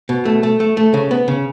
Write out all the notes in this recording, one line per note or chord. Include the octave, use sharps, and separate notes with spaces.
B2
A3
A3
A3
A3
C#3
B3
C#3